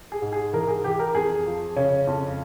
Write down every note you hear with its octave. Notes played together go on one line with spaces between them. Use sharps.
G#4
G#2
G#4
E3 A#4
G#4
E3 G4
A#4
F2 G#4
F3
C#3 C#4
F2